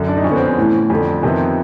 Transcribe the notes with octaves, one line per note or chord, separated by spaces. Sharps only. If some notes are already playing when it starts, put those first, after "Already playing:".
Already playing: F#2 D3
D4
D#4
F2 C#4
D3 B3
C4
C#4
A2 E3
F2 D3
F2 C3 D#3 B3